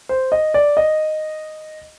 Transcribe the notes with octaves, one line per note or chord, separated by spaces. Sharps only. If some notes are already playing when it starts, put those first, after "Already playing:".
C5
D#5
D5
D#5